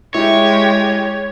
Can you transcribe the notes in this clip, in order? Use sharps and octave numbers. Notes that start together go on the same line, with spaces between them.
G#3 E4 G4 C#5 E5